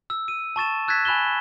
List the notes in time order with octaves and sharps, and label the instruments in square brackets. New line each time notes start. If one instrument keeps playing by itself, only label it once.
[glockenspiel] E6
D#7
A5 C#6 A6 E7
E6 F#6 G#6 A6 B6 E7
G#5 B5 F#6 E7 G7